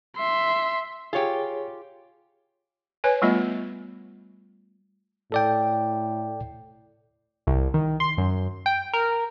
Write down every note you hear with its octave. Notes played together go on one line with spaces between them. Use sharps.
E5 C6
F4 G4 G#4 C#5
B4 C#5 G#5
G3 A3 B3 F4 D#5
A2 A4 D5 G5
C2
D#3
C6
F#2
G5
A#4